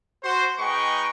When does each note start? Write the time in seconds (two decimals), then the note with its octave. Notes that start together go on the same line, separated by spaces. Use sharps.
0.22 F#4 C5
0.59 G#3 D#4 B4 G5 C#6